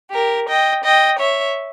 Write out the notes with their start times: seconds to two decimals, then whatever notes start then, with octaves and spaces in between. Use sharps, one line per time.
0.13 G4 A#4
0.49 D#5 G5
0.84 D#5 G5
1.19 C#5 E5